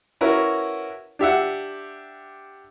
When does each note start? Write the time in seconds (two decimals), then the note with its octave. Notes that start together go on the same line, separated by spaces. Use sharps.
0.21 C#4 E4 F#4 A#4 B4
1.19 D4 G4 E5 F#5